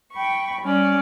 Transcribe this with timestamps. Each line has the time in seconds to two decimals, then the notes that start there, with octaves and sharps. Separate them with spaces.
0.12 G5 B5 C#6
0.62 G3 C#4 D5